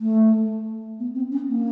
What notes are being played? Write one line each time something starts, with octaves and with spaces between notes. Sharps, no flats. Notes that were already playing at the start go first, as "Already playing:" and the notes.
A3
B3
C4
C#4
A#3